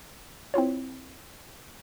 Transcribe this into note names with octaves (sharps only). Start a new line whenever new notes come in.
C4 E4 F4 C#5